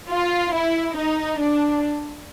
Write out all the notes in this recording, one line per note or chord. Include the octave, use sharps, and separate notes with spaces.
F4
E4
D#4
D4